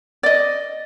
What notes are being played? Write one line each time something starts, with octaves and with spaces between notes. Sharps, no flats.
D5 D#5